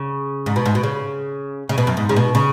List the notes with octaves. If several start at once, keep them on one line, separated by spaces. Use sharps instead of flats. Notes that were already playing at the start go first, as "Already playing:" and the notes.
Already playing: C#3
G#2
B2
G#2
B2
C#3
C#3
B2
F#2
G#2
C#3
B2
C#3